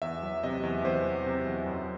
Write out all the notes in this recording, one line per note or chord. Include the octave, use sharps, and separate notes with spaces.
E2 E5
F#3
C3 D#5
E2
E2 C5
F#3
C3
E2
F#2